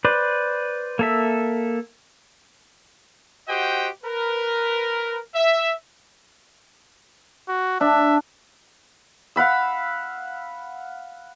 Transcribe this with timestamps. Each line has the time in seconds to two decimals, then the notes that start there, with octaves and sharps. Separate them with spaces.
0.05 B4 C5 D5
0.99 A#3 A4 E5
3.48 F#4 G4 C5 D#5 F#5 G5
4.04 A#4 B4
5.35 E5
7.49 F#4
7.81 D4 E5
9.36 F5 F#5 B5 E6